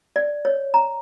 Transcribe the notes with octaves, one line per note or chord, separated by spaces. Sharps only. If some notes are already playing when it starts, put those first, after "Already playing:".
D5
C#5
A#5